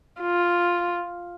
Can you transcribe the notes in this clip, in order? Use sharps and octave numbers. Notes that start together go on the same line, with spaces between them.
F4